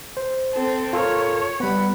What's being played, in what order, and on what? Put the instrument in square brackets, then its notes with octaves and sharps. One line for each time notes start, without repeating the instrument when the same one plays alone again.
[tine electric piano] C5
[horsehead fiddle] C4 A4
[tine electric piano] F4 A4 A#4 [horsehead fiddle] C#5
[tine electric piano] G3 B3 [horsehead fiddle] F#5 B5